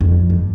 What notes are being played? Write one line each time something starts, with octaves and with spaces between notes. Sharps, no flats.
F2
G2